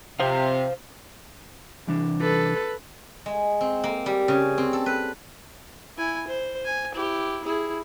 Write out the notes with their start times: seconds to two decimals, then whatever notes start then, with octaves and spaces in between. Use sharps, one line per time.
0.20 C3 C5 F5
1.87 C2 E3 D4
2.21 A4 B4
3.26 G#3
3.61 C4
3.84 A#3
4.06 G3
4.28 C#3
4.58 C4
4.73 A4
4.86 B4
5.98 E4 G#5
6.28 C5
6.65 G#5
6.95 E4 G4
7.44 E4 G#4